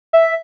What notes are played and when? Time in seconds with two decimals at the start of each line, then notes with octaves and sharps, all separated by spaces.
0.13 E5